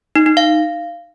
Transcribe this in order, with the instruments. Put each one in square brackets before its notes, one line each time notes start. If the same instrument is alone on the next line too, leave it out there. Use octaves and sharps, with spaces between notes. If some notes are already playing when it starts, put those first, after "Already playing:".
[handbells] D#4
D#4
F5